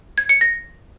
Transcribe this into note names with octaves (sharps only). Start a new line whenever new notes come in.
G#6
C#7
A#6